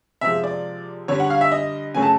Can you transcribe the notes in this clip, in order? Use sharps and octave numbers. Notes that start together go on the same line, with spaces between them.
C3 F3 G#3 E5
D5
D3 G3 C#5
F#5
F5
E5
D#5
C#3 F#3 A3 G#5
A5